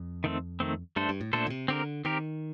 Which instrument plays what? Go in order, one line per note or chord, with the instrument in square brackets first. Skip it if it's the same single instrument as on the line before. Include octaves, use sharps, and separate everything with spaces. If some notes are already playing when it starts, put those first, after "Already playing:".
Already playing: [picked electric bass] F2
[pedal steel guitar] D#3 A3 C4
D#3 A3 C4
[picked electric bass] G2 [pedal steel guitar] A3 D4 A4 C5
[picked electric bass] G2
A2
[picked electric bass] A#2 [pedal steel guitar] A3 D4 A4 C5
[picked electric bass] D3
C3
[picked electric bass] D3 [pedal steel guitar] C4 G4 A#4
[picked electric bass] D#3 [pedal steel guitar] C4 G4 A#4